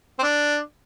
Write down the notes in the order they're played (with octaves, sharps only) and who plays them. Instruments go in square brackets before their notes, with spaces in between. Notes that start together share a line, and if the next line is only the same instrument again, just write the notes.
[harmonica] C4
D4